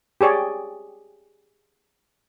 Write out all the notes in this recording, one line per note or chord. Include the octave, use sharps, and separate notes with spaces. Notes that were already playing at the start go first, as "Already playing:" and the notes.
G4 G#4 C#5 D5 G5